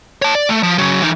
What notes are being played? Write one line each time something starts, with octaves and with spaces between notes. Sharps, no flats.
C#5 A5
D5
A3
F3
C#3 F#3
E3 D#4